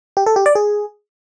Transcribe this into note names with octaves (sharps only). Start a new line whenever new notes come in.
G4
A4
G4
D5
G#4